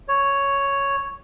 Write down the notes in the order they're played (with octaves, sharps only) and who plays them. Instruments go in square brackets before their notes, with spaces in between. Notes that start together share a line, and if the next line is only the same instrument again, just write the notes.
[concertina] C#5